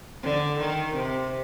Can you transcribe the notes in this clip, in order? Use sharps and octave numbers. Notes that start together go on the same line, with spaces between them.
D3
D#3
C3